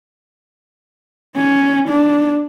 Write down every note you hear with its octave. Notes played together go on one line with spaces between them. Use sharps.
C#4
D4